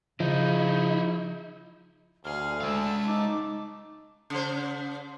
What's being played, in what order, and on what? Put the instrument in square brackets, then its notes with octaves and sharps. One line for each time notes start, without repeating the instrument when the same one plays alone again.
[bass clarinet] C#3 [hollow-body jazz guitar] F3 [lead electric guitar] D#4 E4
[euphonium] D2 [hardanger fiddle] G#4 F5 [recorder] F6
[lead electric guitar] G#3 F5 [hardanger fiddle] A5 [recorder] E6
[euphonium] D#4 [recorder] D6
[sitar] C#3 C5